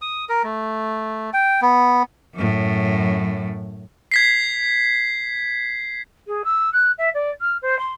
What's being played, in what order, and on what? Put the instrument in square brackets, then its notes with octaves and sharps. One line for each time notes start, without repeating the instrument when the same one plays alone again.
[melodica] D#6
A#4
A3
G5
B3
[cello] F#2 A2
[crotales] G#6 B6 C7
[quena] G#4
E6
F#6
E5
D5
F6
C5
C6